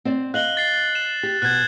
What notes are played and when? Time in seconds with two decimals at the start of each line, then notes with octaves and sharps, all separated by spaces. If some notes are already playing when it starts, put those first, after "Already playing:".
0.05 C4 D5
0.34 D#5 F5 F#6 F#7 G7
0.57 A6 C7
0.95 E7
1.23 G4
1.42 B2 F#6 G#6